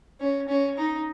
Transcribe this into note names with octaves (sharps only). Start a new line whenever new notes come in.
C#4
C#4
D#4